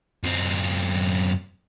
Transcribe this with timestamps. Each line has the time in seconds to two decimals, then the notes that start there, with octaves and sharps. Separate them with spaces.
0.24 F#2 C4